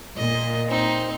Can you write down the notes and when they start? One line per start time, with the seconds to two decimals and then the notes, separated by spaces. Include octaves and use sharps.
0.17 A#2 D#5
0.68 C4 D#4